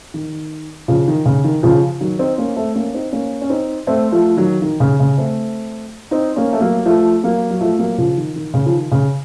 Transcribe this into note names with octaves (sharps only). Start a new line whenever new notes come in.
D#3
C#3 F3
D#3
C#3
D#3
C#3 F3
D#3 F#3
C4 D#4
A#3 C#4
A3 C4
A#3 C#4
C4 D#4
A#3 C#4
C#4
C4 D#4
A3 C4
F3 A3
D#3 F#3
D#3
C#3
C#3
A3 C4
C4 D#4
A#3 C#4
A3
F#3 A#3
F3 A3
F#3 A#3
F#3
F3 A3
F#3 A#3
C#3 F3
D#3
D#3
C#3
F3
D#3
C#3